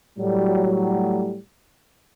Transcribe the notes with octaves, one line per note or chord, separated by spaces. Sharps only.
A2 F#3 G3